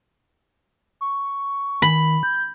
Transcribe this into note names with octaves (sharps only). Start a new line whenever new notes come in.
C#6
D#3 B5
G6